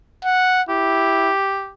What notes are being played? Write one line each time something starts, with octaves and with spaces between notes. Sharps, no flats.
F#5
E4 G4